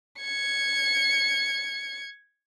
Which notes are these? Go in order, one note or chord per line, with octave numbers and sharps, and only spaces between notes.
G#6 C#7